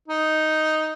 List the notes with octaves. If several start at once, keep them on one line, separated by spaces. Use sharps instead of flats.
D#4